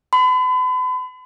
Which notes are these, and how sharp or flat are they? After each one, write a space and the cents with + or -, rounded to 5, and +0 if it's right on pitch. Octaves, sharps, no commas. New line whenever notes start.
B5 +40